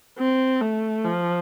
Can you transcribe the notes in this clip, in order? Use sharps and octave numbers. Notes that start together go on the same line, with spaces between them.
C4
A3
F3